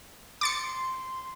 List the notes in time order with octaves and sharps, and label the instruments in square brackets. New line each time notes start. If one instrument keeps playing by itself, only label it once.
[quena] C6 [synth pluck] D6 A6 C#7